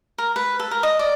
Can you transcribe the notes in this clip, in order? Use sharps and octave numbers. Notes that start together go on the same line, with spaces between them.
A#4
B4
A4
A#4
D#5
D5